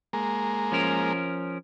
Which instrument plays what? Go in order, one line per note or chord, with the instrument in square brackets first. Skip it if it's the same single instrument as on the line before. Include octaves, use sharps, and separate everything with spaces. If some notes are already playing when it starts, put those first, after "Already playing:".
[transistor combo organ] G#3 A#3
[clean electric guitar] F3 C#4 A#4